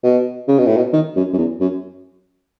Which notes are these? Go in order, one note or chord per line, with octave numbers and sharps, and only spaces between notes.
B2
C#3
B2
A2
B2
D#3
F#2
F#2
E2
F#2